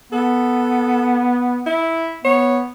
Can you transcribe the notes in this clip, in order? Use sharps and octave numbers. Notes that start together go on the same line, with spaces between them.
B3 A4
E4
B3 C#5